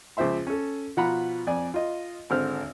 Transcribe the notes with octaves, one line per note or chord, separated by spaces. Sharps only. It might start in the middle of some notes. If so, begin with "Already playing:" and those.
C#2 F3 C5 E5 C6
C#4 A4
B2 F3 F4 F#5 A#5 B5
F2 D5 G#5
F4 D#5
G#1 D3 C5 F6